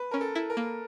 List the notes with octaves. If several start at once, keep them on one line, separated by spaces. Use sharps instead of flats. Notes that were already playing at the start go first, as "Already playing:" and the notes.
Already playing: B4
C#4 A#4
A4
E4
A#4
A#3